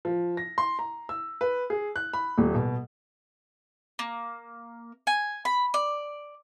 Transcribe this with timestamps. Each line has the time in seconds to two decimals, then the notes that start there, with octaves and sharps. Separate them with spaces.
0.05 F3
0.37 A#6
0.58 C6
0.79 A#5
1.09 E6
1.41 B4
1.70 G#4
1.96 F#6
2.13 B5
2.38 D#1
2.55 B2
3.99 A#3
5.07 G#5
5.45 B5
5.74 D5